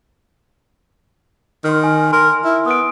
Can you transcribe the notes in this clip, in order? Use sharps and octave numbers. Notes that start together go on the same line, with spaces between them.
D#3 C6 F6
G#5
A#4 C6
E4
B3 D#6 D7